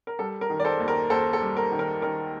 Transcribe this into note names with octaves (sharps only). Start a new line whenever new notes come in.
A#4
G3 A4
A#4
D#3
D5
A4 C5
D#2
A#4
D#2 A4 C5
A4
G3
A#4
D#3
A#4
D#3 A#4